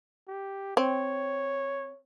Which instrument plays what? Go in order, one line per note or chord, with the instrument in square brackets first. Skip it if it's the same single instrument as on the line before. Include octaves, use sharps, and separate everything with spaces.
[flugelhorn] G4
[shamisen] C4 [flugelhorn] C#5